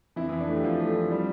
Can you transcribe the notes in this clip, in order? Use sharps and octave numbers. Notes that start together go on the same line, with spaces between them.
F2 E3 E4
F2 E3 E4
D4
A3
G4
F2 F3 F4
A3
E3
G3